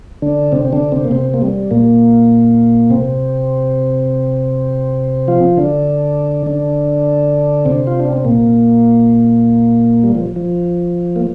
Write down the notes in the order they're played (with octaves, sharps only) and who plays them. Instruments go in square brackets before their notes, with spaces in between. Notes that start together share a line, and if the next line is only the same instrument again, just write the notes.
[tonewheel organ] D3 D4
C3 C4
C4
D3 D4
C3 C4
A#3
C3 C4
A#3
G3
A#2 A#3
C3 C4
F3 F4
D3 D4
D3 D4
C3 C4
F4
D4
C4
A#2 A#3
G3
F3
F3
A#3